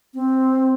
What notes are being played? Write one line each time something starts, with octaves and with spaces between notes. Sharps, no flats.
C4